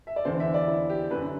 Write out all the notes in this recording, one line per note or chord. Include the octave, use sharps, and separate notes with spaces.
E5
D5
E2 D3 C5
E5
D5
E4
G4
F#2 D3 B4